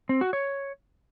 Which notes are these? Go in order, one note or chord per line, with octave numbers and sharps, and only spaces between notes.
C4
F#4
C#5